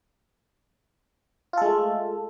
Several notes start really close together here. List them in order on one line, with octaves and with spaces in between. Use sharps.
F4 A4 G#3 A3